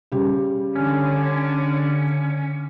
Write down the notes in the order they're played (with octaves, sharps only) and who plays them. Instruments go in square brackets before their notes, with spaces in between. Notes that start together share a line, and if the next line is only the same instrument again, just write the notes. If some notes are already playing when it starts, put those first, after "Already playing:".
[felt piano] C#3 G3
[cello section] D3 [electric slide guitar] C#4